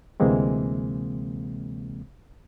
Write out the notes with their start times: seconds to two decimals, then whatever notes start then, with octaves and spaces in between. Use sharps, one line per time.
0.20 D2 C3 E3 G#3 A#3 C4